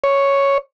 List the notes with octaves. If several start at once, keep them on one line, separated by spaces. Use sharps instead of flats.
C#5